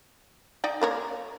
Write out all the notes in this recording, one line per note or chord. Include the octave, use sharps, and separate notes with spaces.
D#4 D5 G5
A#3 A#4 C#5